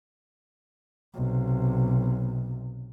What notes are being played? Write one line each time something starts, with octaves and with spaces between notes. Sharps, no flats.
B1 C3